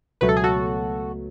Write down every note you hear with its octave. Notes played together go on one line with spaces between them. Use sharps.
C#2 B2 F#3 A3 B4
A4
G#4
F#4 A4